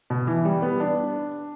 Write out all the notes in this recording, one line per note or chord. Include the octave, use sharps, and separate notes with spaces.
B2
E3
G3
B3
D4